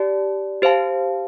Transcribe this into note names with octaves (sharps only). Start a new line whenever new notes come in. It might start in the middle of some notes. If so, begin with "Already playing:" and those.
Already playing: G4 D5 A5
G4 C5 F5 A5